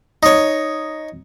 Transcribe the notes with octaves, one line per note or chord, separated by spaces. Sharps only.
D#4 C#5